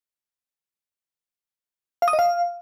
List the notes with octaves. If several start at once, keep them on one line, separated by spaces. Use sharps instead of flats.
F5
D#6
D#5
F5